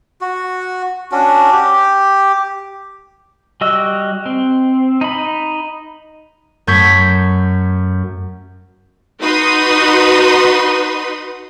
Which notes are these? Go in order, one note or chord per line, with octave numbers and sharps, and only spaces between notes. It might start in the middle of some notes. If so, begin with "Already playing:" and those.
F#4
C#4 D4 F#4
G4
G3 F#4 D#5 E6
C4
D#4 B5
F#2 A3 C#6 G6 G#6 B6
D#4 F#4 B4 C6 D#6